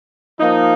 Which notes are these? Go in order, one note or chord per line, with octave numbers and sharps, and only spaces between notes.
F3 A#3 D#4